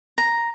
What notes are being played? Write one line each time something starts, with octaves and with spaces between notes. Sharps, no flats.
A#5